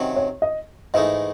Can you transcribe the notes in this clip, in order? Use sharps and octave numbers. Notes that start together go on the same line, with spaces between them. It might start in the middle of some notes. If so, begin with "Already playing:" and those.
Already playing: C3 D#3 F#3 C#4
C#5
D#5
G#2 E3 A3 D#4 D#5